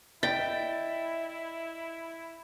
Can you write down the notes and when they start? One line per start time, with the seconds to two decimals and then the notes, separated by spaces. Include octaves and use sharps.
0.23 E4 D5 D#5 G5 A6 B6